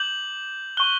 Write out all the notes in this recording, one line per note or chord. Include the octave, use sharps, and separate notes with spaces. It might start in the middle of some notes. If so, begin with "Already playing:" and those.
Already playing: D6 G6 F#7
C#6 F#6 G7